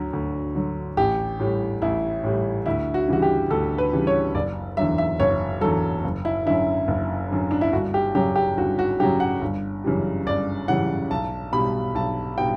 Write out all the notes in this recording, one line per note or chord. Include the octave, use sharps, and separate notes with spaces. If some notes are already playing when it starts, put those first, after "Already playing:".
Already playing: D2 D3 F#3
D2
D3 F#3
A1 G4
A2 G3
A1 E4
A2 G3
D2 E4
F#4
C#3 E3 G3 F#4
G4
D2 A4
B4
C#3 E3 G3
C#5
F#1 D5
E2 D3 F#3 E5
E5
F#1 C#5
E2 D3 F#3 A4
F#1
E4
F#2 D3 E4
F#1
F#2 D3
D4
E4
G1 F#4
G4
F#2 C#3 F#3 G4
G4
G1 F#4
F#4
F#2 C#3 F#3 G4
F#5
G1
F#2 C#3 E3 G3
G1 D5
F#2 C#3 E3 G3 F#5
B1 A5
B2 G3 B5
B1 A5
B2 G3 G5